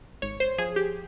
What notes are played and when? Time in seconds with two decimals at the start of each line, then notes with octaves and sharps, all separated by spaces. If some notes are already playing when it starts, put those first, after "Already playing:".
0.22 G#1 C#5
0.40 C5
0.58 F3 G#4
0.76 G4